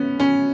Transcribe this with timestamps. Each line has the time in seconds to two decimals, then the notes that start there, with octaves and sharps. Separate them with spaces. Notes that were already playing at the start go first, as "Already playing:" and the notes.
Already playing: B3 C#4
0.20 C#4